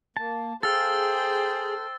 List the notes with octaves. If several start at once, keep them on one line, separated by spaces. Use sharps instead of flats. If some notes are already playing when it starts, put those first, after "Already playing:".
A#3 A5
G#4 A4 C5 F5 G5 E6 A6